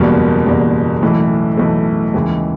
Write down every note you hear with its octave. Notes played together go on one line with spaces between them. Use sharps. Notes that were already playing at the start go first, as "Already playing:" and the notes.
Already playing: F#1 E2 B2 G3 A#3
F#1 E2 B2 G3 A#3
B1 A2 E3 A3
B1 A2 E3 A3
D#2 C#3 E3 G#3